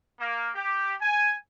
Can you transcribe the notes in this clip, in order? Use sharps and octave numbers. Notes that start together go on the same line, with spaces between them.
A#3
G4
G#5